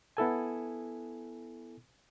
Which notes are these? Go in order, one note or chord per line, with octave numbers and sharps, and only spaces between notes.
B3 E4 A4 G#5